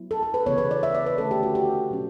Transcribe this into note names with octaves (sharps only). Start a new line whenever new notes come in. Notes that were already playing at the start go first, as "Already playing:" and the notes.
Already playing: F#3 B3 E4
A4
A4
B4
C#3 E3 B3 C#5
B4
D5
E5
D5
B4
D3 A3 C#4 A4
G4
F#4
G4
B2 F#3 C#4